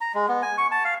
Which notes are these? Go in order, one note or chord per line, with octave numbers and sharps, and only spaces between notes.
A#5
G#3
B3
G#5
C#6
A5
F5